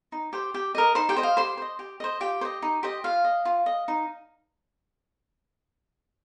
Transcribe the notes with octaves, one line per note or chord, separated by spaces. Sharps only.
D#4
G4 C5
G4
A#4 D#5
D#4 C5 C6
G4 G5
C5 D#5
F5
G4 C5 C6
C5 D#5
G4
C5 D#5
F4 G4 G5
C5
D#5
D#4
G4 C5 D#5
F4 F5
D#5
F4
D#5
D#4